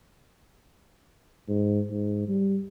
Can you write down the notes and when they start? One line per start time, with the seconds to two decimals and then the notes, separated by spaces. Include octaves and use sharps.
1.48 G#2
1.90 G#2
2.28 G3